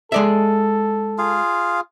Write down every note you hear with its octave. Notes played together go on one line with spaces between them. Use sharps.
G#3 A4 D5 E5
F4 G#4 F5